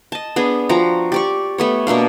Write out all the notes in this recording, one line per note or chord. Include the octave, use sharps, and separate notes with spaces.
D#5 A5
B3 D4 G#4
F3 F#4 G5 A#5
G4 D5 C#6
A3 B3 C#5
B2 A#3 D4 F5